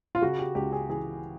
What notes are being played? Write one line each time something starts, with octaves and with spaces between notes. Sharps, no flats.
F4
C#3 F#4
G4
C#2 G4
G#4
E3 G#4